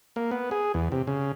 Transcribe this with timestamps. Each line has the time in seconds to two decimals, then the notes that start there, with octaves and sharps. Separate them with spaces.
0.16 A#3
0.31 B3
0.51 G#4
0.74 E2
0.92 C3
1.07 C#3